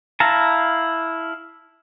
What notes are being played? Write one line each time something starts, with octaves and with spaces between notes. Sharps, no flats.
E4 F5 A5 A#5